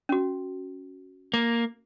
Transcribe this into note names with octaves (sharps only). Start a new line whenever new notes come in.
C#4 F#4
A#3